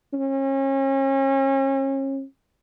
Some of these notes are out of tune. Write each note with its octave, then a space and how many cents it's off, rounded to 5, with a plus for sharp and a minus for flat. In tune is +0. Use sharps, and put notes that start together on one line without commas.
C#4 -35